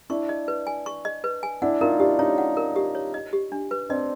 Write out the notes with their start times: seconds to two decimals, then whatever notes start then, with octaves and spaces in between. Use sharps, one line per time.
0.10 D4 E4 C#6
0.29 D#5
0.48 B4
0.67 G#5
0.86 C#6
1.05 D#5
1.24 B4
1.43 G#5
1.62 D4 E4 F#5
1.81 D#4 F4 A#4
2.00 D4 E4 G4
2.19 C#4 D#4 C#5
2.38 F#5
2.57 A#4
2.76 G4
2.95 C#5
3.14 D#5
3.33 G4
3.52 D4
3.71 B4
3.89 C4 D4 D#5